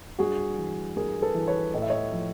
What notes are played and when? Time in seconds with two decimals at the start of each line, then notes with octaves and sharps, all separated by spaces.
0.19 G2 F#4 G#4
0.58 E3
0.96 G2 G#4 A#4
1.22 A4 B4
1.34 E3
1.48 B4 C#5
1.74 A2 D#5
1.82 E5
1.90 C#5 D#5
2.12 F3